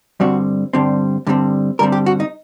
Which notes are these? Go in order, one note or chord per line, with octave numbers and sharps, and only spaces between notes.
G2 D3 G3 C4 F#4
G2 D3 G3 C4
G2 D3 G3 C4
G2 D3 G3 C4 A#4
G4
F#4
D#4